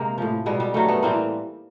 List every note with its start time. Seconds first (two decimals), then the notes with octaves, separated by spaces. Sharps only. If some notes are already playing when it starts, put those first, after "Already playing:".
Already playing: C3 G#3 A#3 C4
0.18 A2 F3
0.46 B2 G3 G#3
0.60 G3
0.74 G2 D#3 F#3 G3 A3
0.88 A3 B3
1.03 A2 E3 G3 A#3 C4